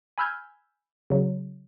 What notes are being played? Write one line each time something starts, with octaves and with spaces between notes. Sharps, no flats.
G#5 B5 E6 F6 G6 G#6
C#3 F#3